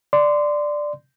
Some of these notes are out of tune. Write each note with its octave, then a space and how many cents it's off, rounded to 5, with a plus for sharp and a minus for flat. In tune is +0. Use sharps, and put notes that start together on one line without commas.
D5 +5 C6 -20